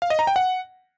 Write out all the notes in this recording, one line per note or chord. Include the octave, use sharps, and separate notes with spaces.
F5
D#5
A#5
G5
F#5